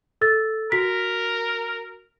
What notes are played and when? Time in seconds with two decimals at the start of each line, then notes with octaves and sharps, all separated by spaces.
0.21 A4 E6 A6
0.72 F#4 A#4 B6